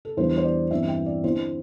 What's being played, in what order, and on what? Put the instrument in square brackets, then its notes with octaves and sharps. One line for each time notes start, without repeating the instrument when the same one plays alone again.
[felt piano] A4
E2 E3 G3 D4 C5
C5
D5
G2 E3 G3 C4 E5
G5
D5
D3 C4 E4 C5